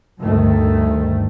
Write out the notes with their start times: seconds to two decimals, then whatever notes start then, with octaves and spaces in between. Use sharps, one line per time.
0.21 D2 G2 D#3 A3